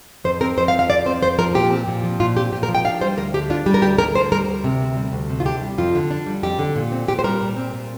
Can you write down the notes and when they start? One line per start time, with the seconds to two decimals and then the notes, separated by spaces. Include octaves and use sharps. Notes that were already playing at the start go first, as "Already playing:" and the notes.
0.24 F2 C5
0.41 C4 A#4
0.57 F2 C5
0.68 F5
0.74 F3
0.79 F5
0.90 F2 D5
1.06 C4 C5
1.22 F2 C5
1.38 F3 A#4
1.54 A#2 G4
1.71 C4
1.88 A#2
2.04 F3
2.20 A#2 F4
2.37 C4 G4
2.52 A#2 G4
2.63 A#4
2.68 F3
2.75 G5
2.84 D4 F5
3.01 G3 C5
3.17 D2 A#4
3.34 D3 G4
3.50 D4 F4
3.66 G3 G4
3.74 A#4
3.82 D2 G4
3.99 D3 A#4
4.15 D2 C5
4.32 G3 A#4
4.48 D2
4.64 C3
4.81 D2
4.97 G3
5.13 D2
5.30 C3
5.40 F4
5.45 D4 G4
5.61 G3
5.78 F2 F4
5.95 D3
6.11 D4
6.27 G3
6.43 F2 G4
6.59 D3
6.76 A#2
6.92 C4
7.08 A#2 G4
7.19 C5
7.24 G3 A#4
7.41 A#2
7.56 C4
7.74 A#2